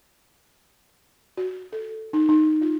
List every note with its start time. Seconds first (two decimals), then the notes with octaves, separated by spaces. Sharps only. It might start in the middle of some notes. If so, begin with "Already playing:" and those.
1.37 F#4
1.72 A4
2.13 D#4
2.29 D#4
2.62 F4